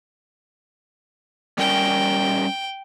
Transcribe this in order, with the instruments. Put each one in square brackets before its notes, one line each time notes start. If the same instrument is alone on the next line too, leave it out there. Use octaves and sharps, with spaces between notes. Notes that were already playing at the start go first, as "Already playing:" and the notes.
[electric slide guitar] G3 C#4 A#4 [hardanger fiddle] G5